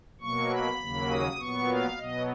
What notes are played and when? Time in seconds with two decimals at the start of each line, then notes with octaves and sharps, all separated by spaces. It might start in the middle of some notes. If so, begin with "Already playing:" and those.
0.21 B2 F#3 A#3 C#6
0.51 B5
0.80 D#2 C#3 F#3 A#3
1.10 D#6
1.39 A#2 F#3 B3 C#6
1.68 F5
1.98 B2 F#3 B3 D#5